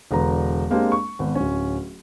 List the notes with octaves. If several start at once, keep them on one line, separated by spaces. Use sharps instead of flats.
E1 D3 B4 A#5
G#3 A#3 C4 D4 G4 A#4
C#6
G#1 B3
D1 C#4